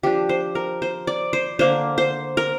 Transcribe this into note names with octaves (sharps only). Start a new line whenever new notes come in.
F3 D4 G4
C5
A#4
C5
D5
C5
D3 A#3 D4 C5
C5
A#4